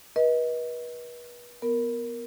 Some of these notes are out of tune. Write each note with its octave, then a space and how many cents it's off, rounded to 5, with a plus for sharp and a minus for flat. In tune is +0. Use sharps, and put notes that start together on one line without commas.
B4 -35 D#5 +25
B3 +0 A#4 +0